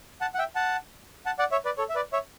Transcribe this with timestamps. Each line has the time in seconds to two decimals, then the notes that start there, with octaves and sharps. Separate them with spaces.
0.21 F#5 A5
0.34 F#5
0.38 E5 G5
0.55 F#5 A5
1.26 F#5 A5
1.39 D5 F#5
1.51 C#5 E5
1.65 B4 D5
1.78 A4 C#5
1.89 E5
1.95 B4 D5
2.13 C#5 E5